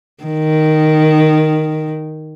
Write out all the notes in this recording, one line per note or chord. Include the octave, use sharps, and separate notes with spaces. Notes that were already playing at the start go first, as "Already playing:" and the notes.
D#3